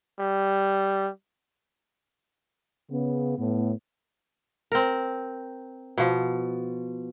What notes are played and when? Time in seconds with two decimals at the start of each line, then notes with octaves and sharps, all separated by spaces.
0.19 G3
2.90 C#3 B3
3.38 A2 B3
4.72 C4 A#4
5.98 B2 F3